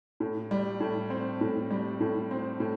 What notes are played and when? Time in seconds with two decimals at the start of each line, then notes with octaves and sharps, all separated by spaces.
0.20 A2
0.51 G3
0.80 A2
1.10 C4
1.41 A2
1.71 G3
2.01 A2
2.31 C4
2.60 A2